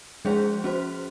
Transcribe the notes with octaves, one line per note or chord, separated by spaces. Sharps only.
F3 G#3 C#4 G#4 C5
C#4 F#4 C5